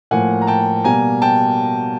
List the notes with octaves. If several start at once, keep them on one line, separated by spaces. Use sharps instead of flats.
A2 F3 A#3 F#5 G#5
A#5
G5 A5
B2 G3 A#3 G#5 A#5
G5 A5